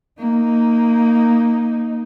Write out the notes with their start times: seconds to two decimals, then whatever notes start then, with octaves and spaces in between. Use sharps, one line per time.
0.19 A#3 D#4